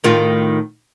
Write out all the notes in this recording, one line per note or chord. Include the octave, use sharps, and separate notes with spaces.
A2 D#3 F4